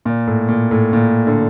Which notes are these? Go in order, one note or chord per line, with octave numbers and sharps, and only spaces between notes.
A#2
A2
A#2
A2
A#2
D3